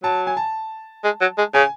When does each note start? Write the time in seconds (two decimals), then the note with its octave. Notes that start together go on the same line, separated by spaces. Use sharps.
0.03 F#3 A5
0.27 G#5
0.37 A5
1.04 G#3
1.21 F#3
1.38 G#3
1.54 C#3 G#5